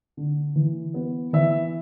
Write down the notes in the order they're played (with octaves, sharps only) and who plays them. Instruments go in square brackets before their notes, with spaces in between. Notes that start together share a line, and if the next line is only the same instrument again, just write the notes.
[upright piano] D3
E3
B3
E3 E5